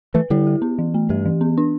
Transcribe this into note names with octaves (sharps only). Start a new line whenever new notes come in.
E3 A3 B4
D3 G3 E4
G4
B3
E3
A3
G2 G4
E3
B3
D4